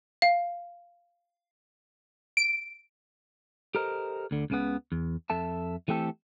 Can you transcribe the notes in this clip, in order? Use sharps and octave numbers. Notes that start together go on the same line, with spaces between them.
F5
D7
G4 A4 A#4 C5 D#5
D2 D3
C#2 C#3 B3
E2
F2 A4 E5 A5
E3 A3 C4 G4 A4